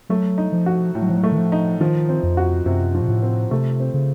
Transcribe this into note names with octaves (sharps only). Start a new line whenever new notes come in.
F#3 A3
D#4
F3
F#4
A2
F#3
F3
F#3
A3
D#3
F3
D#4
D#3 F3
C4
F2
F#4
F#2 C3
F3
A#2
A2
C4
C3 A3
C4
C#3